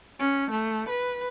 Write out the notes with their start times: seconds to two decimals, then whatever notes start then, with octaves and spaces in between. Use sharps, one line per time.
0.20 C#4
0.50 A3
0.89 B4